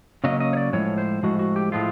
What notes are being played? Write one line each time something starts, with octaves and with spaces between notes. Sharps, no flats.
C#3 F#3 A#3 C#4 D#5
D#5
C#5
D5
A2 F3 G#3 C#5
C5
A2 F3 G#3 F#4
F#4
G4
A2 F3 G#3 F4